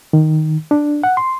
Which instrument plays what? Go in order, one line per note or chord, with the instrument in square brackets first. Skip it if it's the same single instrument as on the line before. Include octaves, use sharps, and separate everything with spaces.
[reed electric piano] D#3
D4
F#5
C6